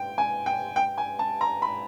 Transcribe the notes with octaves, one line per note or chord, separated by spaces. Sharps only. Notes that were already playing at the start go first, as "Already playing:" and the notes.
Already playing: G5
G#5
G5
G5
G#5
A5
A#5
B5